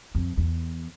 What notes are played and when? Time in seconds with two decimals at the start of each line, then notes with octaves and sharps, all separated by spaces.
0.15 F2
0.37 E2